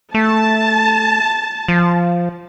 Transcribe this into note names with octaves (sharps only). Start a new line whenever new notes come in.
A3 A5
F3